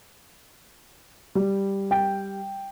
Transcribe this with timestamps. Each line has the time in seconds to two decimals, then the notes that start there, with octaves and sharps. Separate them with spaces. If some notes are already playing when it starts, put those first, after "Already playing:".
1.35 G3
1.91 G5